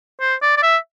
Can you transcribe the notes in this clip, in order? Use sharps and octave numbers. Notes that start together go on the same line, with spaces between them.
C5
D5
D5
E5